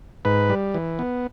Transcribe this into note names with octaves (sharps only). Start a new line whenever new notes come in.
G#2 B4
G3
E3
B3